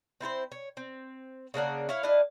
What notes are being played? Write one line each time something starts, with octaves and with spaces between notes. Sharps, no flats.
C4 E4 A4 C5
C#5
C4
C#3 A#3 D4 F#5
E4 C#5 F5
D4 E4 D#5 F5